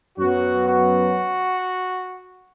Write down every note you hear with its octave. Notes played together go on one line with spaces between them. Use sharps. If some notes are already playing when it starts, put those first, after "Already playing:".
F#2 F#3 B3 F#4
F#4